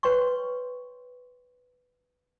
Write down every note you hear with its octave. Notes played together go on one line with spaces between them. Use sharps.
B4 C#5 G5 C6 C#6